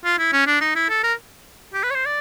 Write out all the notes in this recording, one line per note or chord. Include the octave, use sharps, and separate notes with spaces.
F4
E4
C#4
D4
D#4
E4
A4
A#4
G4
B4
C#5
C5
D5